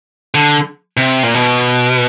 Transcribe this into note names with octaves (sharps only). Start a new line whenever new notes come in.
D3
C3
A#2
B2